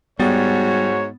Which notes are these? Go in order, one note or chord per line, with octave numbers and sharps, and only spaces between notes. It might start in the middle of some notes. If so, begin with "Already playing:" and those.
G#2 G3 B3 F#4 C#5 A6